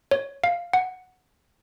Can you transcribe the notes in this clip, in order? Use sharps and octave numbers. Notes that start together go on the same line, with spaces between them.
C#5
F5
F#5